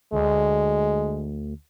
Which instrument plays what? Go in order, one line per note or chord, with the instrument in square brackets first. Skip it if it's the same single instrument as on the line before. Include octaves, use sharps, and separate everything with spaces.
[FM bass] D2 [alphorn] G#3